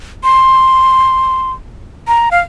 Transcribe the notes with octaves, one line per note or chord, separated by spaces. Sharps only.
C6
A#5
F5